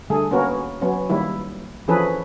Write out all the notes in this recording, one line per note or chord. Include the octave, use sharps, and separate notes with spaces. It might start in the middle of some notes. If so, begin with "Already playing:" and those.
D3 G3 A3 G#4 A4
A#3 B3 C#4 F#4 A#4
F#3 B3 C#4
D#3 G3 A#3 E4
E3 F3 C#4 G#4 A4 B4